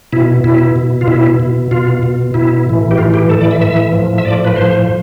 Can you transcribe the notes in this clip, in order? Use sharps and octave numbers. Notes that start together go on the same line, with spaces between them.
B2 E4
B2 E4
B2
F4
B2 E4
B2
B2 F4
B2
B2 E4
A2 E3
G4
A2 E3 F4
G4
A2 E3 A4
D5
E5
A2 E3 E5
A2 F3
E5
A2 F3 D5
B4
A2 F3 C5